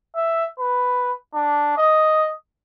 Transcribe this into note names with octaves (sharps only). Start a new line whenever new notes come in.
E5
B4
D4
D#5